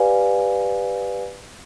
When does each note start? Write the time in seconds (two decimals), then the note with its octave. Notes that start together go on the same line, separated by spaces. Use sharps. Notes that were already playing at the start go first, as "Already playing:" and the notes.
Already playing: G4 B4 D5 F5 G#5